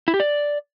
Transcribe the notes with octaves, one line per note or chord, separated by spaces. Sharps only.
E4
G4
D5